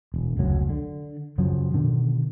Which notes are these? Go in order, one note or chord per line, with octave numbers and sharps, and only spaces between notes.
E1
F1 C#2 F#3
D3
F#2 C#3 F3 F#3
B2 D3 D#3